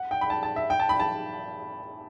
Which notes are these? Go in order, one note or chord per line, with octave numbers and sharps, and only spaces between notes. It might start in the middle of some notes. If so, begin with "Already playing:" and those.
Already playing: F#5
G5
B5
A5
A5
E5
G5
A5
B5
A5